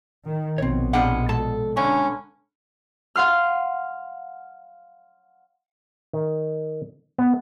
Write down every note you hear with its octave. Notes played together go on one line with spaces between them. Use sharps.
D#3
A#1 B2 C4 C#5
G3 G#3 C4 D4 F5 F#5
G#3 A4 A5
G2 D3 C#4
F5 F#5 C6 F6
D#3
B3